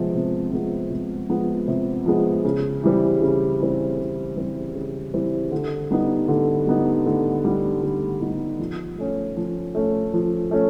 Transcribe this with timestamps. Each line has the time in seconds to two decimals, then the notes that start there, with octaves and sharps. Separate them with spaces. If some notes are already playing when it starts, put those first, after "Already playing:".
Already playing: C3 F3 G#3 B3
0.15 C3
0.52 F3 G#3 B3
0.90 C3
1.29 F3 G#3 B3
1.68 C3
2.06 F3 G#3 B3
2.44 C#3
2.84 E3 G3 C4
3.22 C#3
3.60 E3 G3 C4
3.99 C#3
4.36 E3 G3 C4
4.74 C#3
5.14 E3 G3 C4
5.52 D3
5.91 G3 B3 D#4
6.28 D3
6.67 G3 B3 D#4
7.06 D3
7.45 G3 B3 D#4
7.83 D3
8.21 G3 B3 D#4
8.59 F3
8.98 A3 C#4
9.37 F3
9.75 A3 C#4
10.14 F3
10.51 A3 C#4